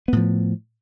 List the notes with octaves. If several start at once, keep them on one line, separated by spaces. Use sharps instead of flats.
A2 F3 B3